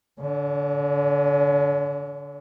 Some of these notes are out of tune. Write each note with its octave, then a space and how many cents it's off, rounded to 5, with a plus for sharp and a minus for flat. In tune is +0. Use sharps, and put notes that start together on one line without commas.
D3 -20 C#4 +35